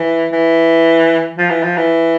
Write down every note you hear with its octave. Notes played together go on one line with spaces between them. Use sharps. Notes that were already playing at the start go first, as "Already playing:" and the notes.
Already playing: E3
E3
F3
E3
F3
E3